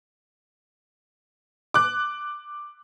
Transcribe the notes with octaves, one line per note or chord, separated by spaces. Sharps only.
D6 F#6